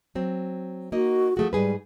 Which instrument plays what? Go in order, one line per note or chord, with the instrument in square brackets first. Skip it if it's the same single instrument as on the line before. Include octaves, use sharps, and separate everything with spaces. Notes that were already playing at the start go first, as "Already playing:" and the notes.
[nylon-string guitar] F#3 C4
[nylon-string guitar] A#3 D#4 D#5 [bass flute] F#4
[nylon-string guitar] F3 A3 F#4 [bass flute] G#4
[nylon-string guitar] G#2 G#4 B4 [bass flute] G3